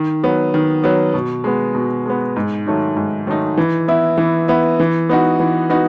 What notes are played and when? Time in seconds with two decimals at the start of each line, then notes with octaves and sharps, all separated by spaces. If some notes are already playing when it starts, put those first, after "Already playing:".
Already playing: D#3
0.23 F#3 B3
0.54 D#3
0.84 F#3 B3
1.14 B2
1.44 G#3 B3
1.75 B2
2.06 G#3 B3
2.36 G#2
2.66 D#3 F#3 A3 D#4
2.97 G#2
3.27 D#3 F#3 A3 D#4
3.58 E3
3.88 B3 E4
4.18 E3
4.48 B3 E4
4.80 E3
5.09 B3 D#4 F#4
5.40 E3
5.70 B3 D#4 F#4